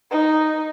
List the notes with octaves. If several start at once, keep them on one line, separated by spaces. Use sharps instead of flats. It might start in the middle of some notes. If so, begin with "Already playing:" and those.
D#4